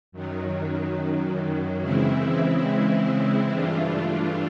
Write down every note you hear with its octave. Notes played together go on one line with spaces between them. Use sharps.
F#2 D#3 F#3
C#3 E3 G#3 C4 E4
G2 E3 A3 D4 F4